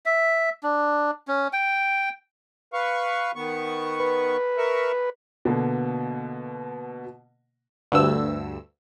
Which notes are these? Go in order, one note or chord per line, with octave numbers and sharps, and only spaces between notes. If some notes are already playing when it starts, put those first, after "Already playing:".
E5
D4
C#4
G5
B4 F5 C#6
D#3 B3 C#6
B4
A#4 E5 C#6
B2 D3 A#3 B3
D2 G2 E6